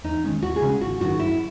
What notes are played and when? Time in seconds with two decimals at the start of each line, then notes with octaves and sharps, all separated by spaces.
0.04 E2 D#4
0.24 D#3 G#3 C#4
0.42 D#2 F#4
0.56 G#4
0.62 C#3 G#3 C#4
0.81 G#1 F#4
1.01 F#2 D#3 F#4
1.19 F#2 E4